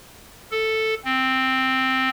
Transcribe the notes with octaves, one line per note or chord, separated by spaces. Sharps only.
A4
C4